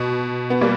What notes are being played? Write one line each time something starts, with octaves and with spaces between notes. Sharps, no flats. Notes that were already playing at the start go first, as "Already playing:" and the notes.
Already playing: B2
B3
G3 A#3